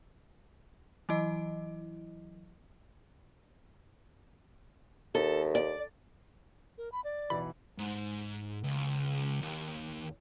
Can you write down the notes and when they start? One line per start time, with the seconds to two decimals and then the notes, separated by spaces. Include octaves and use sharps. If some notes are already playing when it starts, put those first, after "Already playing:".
1.09 E3 F#3 E4 D#5
5.15 D#2 A4
5.55 D5
6.78 A#4
6.92 B5
7.04 D5
7.30 B1 E3 B5
7.79 G#2
8.64 C#2
9.42 D#2